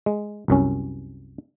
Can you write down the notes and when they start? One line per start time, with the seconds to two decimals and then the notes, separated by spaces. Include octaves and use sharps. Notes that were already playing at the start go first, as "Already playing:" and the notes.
0.06 G#3
0.48 C2 F#2 C#4